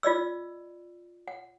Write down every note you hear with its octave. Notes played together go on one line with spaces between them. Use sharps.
F4 D5 D#5 E6
F#5